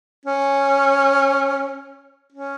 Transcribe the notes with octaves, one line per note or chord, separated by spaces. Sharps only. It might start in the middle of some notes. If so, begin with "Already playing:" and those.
C#4
C#4